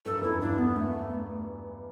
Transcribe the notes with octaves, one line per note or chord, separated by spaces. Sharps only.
G2 A4
F#2
E2 E4
F#2
G2 D4
B3
A3